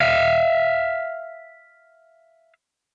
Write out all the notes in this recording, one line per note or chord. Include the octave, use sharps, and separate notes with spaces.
E5 F5